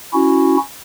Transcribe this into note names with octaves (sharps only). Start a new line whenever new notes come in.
C#4 E4 F#4